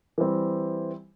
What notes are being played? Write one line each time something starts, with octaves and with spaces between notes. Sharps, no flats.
E3 G3 C4